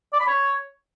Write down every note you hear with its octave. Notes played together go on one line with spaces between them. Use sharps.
D5
B5
C#5